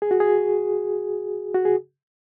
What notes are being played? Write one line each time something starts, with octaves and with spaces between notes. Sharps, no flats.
G#4
F#4
G#4
F#4
G#4